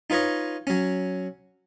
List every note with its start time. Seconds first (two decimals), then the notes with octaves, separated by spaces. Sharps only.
0.10 D#4 F4 B4 C#5 D#5
0.67 F#3 C#4